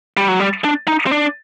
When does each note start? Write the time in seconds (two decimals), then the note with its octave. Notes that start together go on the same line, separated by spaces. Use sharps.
0.17 G3
0.28 F#3
0.40 G3
0.64 D4
0.88 D#4
1.07 C4
1.11 D4